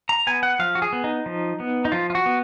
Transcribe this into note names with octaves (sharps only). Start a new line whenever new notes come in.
A#5
B3 G#5
F#5
F3 F5
F#4
G#4
B3
D#4
F3
B3
D#4
F3 F4
F4
F#4
B3